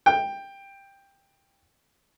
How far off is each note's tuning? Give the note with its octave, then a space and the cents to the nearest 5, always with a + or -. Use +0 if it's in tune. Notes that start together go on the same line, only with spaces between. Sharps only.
G5 +10